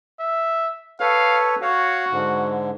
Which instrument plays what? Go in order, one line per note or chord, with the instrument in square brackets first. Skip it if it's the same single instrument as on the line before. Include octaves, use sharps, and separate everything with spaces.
[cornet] E5
[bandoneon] A4 B4 C#5 [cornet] F5
[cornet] F#4 [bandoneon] C#5 F5
[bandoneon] G#2 D3